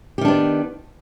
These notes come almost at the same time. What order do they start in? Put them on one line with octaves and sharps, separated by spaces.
G4 D#3 D4 B3